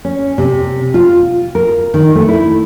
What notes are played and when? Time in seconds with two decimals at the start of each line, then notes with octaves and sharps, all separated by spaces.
0.05 C#4
0.38 C3
0.94 F4
1.55 A#4
1.94 D#3
2.15 A3
2.29 E4